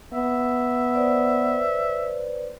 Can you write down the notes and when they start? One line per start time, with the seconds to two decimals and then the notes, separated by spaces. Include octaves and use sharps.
0.13 B3 E5
0.95 B4 C5 D5